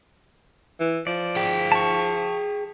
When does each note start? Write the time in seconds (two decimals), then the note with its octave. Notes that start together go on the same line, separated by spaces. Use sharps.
0.80 E3
1.07 F3 D5
1.36 G#4 G5
1.72 A5 C#6